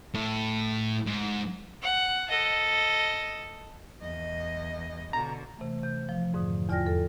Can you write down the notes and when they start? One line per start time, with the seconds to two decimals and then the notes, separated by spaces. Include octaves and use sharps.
0.14 A2
1.06 G#2
1.83 F#5
2.28 A4 D#5
4.01 E2 D#5
5.13 B2 D3 A#5
5.58 C3 E3 A3
5.83 C3 G6
6.09 F3 F5
6.33 F2 G#2 D3 D#6
6.69 E2 F4 D5 G5 F6 A#6
6.87 A4